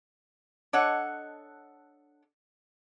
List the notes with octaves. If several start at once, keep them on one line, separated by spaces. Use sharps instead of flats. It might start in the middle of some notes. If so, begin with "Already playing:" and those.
D4 A4 C#5 D#5 F#5